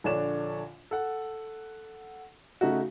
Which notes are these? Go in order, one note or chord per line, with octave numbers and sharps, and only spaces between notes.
A#1 D3 D4 C#5 D5 E7
A4 F#5
C#3 A3 D#4 F#4